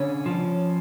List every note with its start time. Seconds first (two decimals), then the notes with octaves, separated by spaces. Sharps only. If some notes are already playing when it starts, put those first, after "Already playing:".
Already playing: D3 C#4
0.26 F3